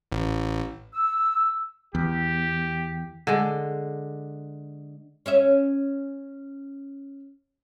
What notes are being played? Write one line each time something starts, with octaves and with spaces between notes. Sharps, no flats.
A1
E6
E2 G4
D3 G#3
C#4 C#5 E5